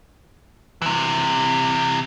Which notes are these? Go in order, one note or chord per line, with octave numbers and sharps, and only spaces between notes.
C3 E3